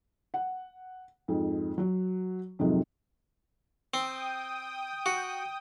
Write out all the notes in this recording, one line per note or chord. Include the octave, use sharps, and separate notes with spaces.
F#5
F2 G#2
F#3 F#4
F2 G#2 C3 D#3 F#3
C4 G5 D#6
F#4